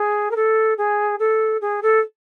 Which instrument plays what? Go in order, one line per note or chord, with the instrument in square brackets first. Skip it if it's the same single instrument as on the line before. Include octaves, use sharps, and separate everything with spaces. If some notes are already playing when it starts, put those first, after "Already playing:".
Already playing: [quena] G#4
A#4
A4
G#4
A4
G#4
A4